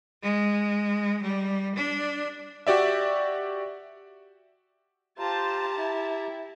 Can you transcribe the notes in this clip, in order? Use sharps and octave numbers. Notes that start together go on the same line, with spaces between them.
G#3
G3
D4
F#4 G4 D5 E5
F4 G4 C5 A5 A#5
E4